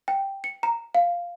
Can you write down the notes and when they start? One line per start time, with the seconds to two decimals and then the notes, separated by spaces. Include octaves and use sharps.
0.08 G5
0.44 C#7
0.63 A#5
0.95 F5